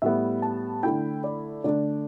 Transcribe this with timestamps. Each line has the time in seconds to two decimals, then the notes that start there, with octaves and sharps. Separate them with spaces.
0.02 A2 G3 B3 E5
0.42 A5
0.83 D3 A3 E4 G5
1.24 D5
1.64 D3 A3 D4 D5